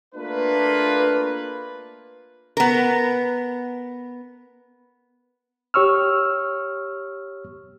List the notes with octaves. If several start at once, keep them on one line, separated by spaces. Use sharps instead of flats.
A3 A#3 D4 F4 B4
B3 A#4
G4 C#5 C#6 E6 F6